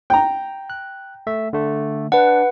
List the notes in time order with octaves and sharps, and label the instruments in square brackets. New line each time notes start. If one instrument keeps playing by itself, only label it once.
[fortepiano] G5 A#5
[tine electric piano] F#6
A3 E5
D3 A3
[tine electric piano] D4 [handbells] B4 F#5